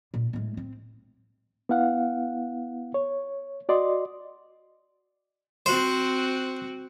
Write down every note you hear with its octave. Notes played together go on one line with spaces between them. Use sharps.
A#2
A2 G#3
C4
B3 E4 F5 F#5
C#5
F#4 D5 D#5 C6
C4 F#4 C5